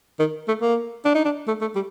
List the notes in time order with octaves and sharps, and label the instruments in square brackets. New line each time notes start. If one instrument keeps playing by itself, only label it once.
[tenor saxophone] D#3
A3
A#3
D4
D#4
D4
A3
A3
G3